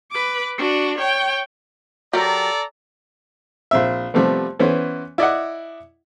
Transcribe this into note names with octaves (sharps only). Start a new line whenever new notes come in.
B4 D6
D4 F#4
C#5 G5
F#3 G4 A4 A#4 D5 A#5
A#1 C4 E5
C3 F3 G3 A3 B3
E3 B3 C#4 C5
E4 D5 D#5 F#5